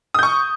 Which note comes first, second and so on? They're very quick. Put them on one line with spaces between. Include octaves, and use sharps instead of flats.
D#6 G6 C#6